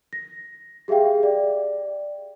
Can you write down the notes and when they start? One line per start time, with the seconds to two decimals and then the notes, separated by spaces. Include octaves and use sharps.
0.13 A#6
0.88 G4 G#4 E5 F5 G5
1.23 D5